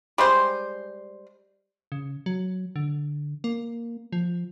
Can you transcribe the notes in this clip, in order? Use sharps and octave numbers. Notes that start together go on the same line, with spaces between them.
G3 G#3 C5
C#3
F#3
D3
A#3
F3